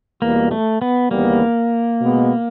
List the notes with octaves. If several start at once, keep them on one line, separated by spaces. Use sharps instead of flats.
E2 B2 G3 A#3 B3
A3
B3
D#2 C#3 E3 G3 A#3 B3
B2 G#3 B3